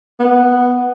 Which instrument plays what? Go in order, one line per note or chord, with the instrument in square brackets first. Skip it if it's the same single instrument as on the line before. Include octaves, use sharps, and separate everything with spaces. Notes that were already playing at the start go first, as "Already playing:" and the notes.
[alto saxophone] B3